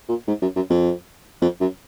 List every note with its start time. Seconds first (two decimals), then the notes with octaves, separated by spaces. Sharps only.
0.08 A#2
0.27 G#2
0.42 F#2
0.56 F#2
0.70 F2
1.41 F2
1.60 F#2